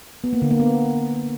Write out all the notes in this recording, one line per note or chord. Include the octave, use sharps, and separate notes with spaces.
B3
A#3
D3
A#3
B3